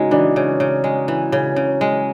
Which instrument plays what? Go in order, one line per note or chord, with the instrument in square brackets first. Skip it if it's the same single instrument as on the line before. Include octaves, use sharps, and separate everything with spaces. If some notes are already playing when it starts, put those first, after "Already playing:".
Already playing: [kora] C#3 G#3 [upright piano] D#4 F#4
[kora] E3 [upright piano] D4
[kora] C#3
C#3
G#3
E3
C#3
C#3
G#3